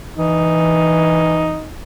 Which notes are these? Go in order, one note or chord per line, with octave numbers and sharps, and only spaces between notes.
E3 D#4